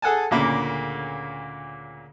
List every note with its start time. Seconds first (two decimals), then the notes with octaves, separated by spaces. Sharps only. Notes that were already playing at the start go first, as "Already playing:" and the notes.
0.02 G#4 A4 F#5 G#5 A5
0.31 D2 A#2 C#3 A#3 B5 D6